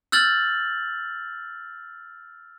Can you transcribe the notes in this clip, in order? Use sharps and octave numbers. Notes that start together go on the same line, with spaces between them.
E6 F6 G6 A6 F#7